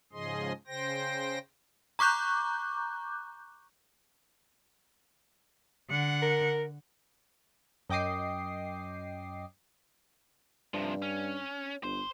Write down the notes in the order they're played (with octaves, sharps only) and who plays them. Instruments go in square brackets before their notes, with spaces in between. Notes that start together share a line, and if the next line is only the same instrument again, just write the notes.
[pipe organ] G#2 C#3 F3 G#4 D#5 C6
C#3 C5 G5 A#6
[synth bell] A#5 C#6 D6 F#6 G6
[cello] D3 F#5
[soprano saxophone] A#4
[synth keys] F#2 D#5 G5 D6 D#6 C7
[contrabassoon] G2 [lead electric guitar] C3 F3
[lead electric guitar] C#4
[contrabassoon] G1 [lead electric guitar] C5